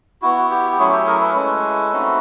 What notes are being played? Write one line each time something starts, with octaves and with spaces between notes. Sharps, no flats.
B3 E4 F#4
F#4
G4
G4
F#3 A3 C#4 E4 F#4 G#4
G4 A4
G#4 A#4
A4 B4
G#3 C#4 E4 A4 B4
A3 C4 D#4 F#4